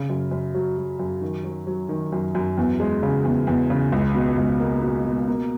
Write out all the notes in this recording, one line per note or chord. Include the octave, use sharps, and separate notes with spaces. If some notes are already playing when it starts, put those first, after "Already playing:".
Already playing: C#3
F#2
F#2
F#3
F#3
F#2
D#3
F#3
F#3
D#3
F#2
F#2
E2
G#3
C#3
E2
E2
C#3
C#2
B2
C#2
A#3
B2
B2
A#3